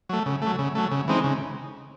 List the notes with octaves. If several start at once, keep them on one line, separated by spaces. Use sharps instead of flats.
F#3 A3
C#3
F#3 A3
C#3
F#3 A3
C#3
E3 G#3 C4 D#4
C#3